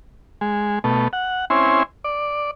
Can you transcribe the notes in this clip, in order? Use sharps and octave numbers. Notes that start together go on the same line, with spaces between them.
G#3
B2 A3
F#5
C4 C#4 E4 G#5 C6
D5